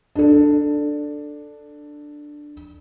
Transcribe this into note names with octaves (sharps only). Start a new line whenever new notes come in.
D4 A4